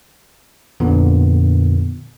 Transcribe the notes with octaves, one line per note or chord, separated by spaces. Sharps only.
F2 A#2 D3 B3